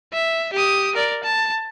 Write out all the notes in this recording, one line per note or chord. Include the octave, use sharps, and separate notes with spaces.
E5
G4 D#6
A#4 D5
A5